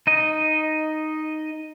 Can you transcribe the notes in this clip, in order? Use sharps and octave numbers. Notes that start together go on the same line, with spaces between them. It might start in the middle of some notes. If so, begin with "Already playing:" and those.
D#4 D#5